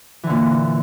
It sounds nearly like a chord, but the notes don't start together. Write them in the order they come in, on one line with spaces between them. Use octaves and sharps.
E3 D3 A#2